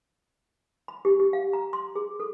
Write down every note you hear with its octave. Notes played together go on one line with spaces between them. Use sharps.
B5
G4
G4
F5
A#5
C6
G#4
A4